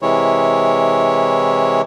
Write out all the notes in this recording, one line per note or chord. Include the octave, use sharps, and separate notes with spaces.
C3 E3 G#3 E4 C#5